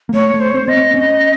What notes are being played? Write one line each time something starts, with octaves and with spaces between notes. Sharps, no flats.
A#3
A3 C#5
A3
C5
C#5
C4 C5
B3 D#5
C4
C#4